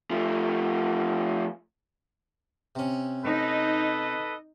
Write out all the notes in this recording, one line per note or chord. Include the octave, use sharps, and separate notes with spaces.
F3 A3
C3 C#4
D#4 A4 B4 D#5